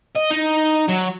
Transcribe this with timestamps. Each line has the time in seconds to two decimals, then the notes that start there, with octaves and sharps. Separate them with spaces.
0.16 D#5
0.31 D#4
0.89 F#3